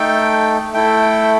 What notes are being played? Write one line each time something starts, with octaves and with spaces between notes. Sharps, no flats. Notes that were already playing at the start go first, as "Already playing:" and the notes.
Already playing: A3 D#4 A4 G5
A3 E4 A4 G5